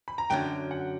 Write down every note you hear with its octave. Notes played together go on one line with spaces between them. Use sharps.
B5
A#5
F#2 D3 F#3 G5
F#5